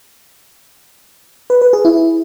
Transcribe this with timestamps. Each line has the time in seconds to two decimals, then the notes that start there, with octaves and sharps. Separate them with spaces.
1.50 B4
1.62 B4
1.73 G#4
1.85 E4